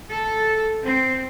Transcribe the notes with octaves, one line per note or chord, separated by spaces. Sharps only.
A4
C4